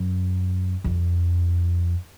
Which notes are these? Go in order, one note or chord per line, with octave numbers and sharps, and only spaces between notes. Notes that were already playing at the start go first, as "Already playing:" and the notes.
Already playing: F#2
F2